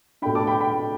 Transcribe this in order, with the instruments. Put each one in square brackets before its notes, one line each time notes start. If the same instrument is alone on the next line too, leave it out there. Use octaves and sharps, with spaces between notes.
[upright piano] B2 A3 D4 G5 B5
A5 D6
G5 B5
G5 B5